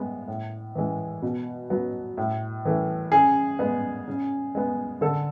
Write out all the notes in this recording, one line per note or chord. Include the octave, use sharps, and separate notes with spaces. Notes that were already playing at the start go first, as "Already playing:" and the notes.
Already playing: A2 G#3 B3
A2
E3 G#3
B2
F#3 B3
A2
E3 A3
C#3 G#4
G#3 B3
C#3
G#3 B3
D3 A4